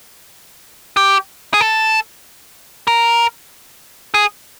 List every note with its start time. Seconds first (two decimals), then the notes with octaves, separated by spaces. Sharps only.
0.97 G4
1.54 G#4
1.61 A4
2.87 A#4
4.14 G#4